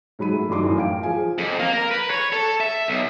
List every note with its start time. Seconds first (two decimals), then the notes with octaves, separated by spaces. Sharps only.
0.19 G#2 F#3 B5 D#7
0.33 A3
0.50 G2 D#3 F#3 C6 D6
0.63 F#2 A2 E3
0.77 F5 G5 D7
1.03 F3 G#4 F5 G#5
1.38 F2
1.60 A#3
1.73 A#4
1.91 B4
2.10 C#5
2.32 A4
2.60 E5
2.88 B1